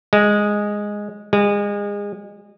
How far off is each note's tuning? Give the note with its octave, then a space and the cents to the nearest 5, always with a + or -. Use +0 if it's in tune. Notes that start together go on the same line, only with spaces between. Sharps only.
G#3 -5
G#3 -30